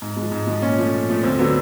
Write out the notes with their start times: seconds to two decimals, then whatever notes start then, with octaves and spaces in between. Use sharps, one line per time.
0.02 G#2
0.16 F3 G#3
0.32 G#2
0.47 F3 G#3
0.62 A#2 C#4
0.78 F3 A3
0.93 A#2
1.09 F3 A3
1.23 D2 C4
1.39 D3 F#3 A3 B3